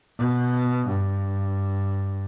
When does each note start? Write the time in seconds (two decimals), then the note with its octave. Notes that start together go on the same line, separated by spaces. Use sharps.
0.18 B2
0.87 G2